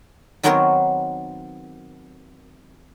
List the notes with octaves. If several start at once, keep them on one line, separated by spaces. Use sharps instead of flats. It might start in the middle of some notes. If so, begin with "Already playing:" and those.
D#3 F#3 B3 C4 A#4 C#5